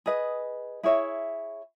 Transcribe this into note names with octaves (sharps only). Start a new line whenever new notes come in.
G#4 B4 D#5
E4 G#4 C#5 E5